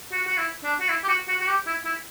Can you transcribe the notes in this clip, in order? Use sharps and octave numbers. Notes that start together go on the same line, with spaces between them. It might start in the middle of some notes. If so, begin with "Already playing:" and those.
F#4
F#4
E4
D4
F#4
E4
G4
F#4
F#4
F#4
G4
E4
E4